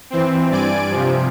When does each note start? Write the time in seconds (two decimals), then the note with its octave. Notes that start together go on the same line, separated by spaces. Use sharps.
0.10 E3 C4
0.50 G2 D5 G#5 D7
0.90 C3 F3